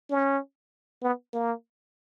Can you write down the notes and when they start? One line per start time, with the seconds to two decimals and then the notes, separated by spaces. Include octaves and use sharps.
0.10 C#4
1.03 B3
1.34 A#3